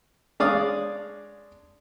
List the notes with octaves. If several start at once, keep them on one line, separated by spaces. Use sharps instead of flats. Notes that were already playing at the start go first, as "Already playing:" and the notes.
G#3 D4 C#5 D5 F5 D#6